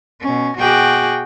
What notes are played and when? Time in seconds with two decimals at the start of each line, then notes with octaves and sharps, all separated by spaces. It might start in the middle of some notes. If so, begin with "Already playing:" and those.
0.22 B2 C#4
0.58 B2 F#4 G#4 G5 D6 F#6